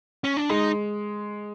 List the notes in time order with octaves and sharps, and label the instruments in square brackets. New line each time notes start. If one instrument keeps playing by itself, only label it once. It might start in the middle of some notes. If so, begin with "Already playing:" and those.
[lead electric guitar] C#4
D4
[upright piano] G#3 [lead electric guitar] D#4